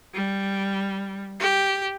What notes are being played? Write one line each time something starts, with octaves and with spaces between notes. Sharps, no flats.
G3
G4